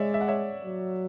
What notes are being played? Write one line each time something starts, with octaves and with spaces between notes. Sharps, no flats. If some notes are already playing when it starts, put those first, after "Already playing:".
Already playing: G#3 C#5 D5 E5
E5
F#5
C#5 E5
F#3